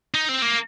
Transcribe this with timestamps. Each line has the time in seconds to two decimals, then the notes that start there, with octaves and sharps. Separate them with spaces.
0.14 D#4
0.29 C4
0.42 A#3